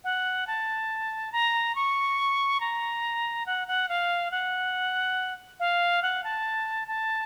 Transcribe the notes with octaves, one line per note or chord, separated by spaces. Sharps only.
F#5
A5
A#5
C#6
A#5
F#5
F#5
F5
F#5
F5
F#5
A5
A5